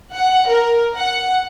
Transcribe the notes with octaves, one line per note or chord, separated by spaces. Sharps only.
F#5
A#4
F#5